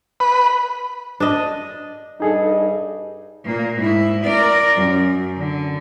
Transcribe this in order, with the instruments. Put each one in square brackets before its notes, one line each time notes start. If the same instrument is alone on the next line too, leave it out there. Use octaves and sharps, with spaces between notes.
[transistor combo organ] B4
[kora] D4 D#5
[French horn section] G2 D#5 [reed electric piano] D#4 G#4 A4
[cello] A#2 A#3
G#2 E4
A#4 D5
F#2
D3